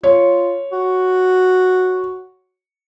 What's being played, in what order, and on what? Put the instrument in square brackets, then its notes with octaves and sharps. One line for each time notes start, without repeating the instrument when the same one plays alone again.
[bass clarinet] F4 [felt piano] C#5
[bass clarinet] F#4